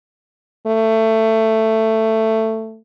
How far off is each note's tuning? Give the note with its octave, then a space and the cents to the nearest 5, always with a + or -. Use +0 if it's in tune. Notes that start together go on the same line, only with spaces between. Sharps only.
A3 +15